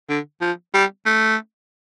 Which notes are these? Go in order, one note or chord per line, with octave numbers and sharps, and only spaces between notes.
D3
F3
G3
A3